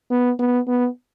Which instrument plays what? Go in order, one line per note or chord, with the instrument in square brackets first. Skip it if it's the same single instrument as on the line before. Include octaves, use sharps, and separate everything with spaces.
[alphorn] B3
B3
B3